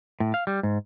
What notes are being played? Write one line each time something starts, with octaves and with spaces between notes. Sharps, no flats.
A2
F5
G3
G#2